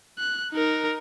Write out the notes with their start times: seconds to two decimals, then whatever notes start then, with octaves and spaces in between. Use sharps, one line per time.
0.18 F#6
0.52 D#4 A#4